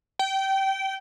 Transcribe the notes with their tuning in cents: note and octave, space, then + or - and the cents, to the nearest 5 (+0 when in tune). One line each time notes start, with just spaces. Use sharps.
G5 -20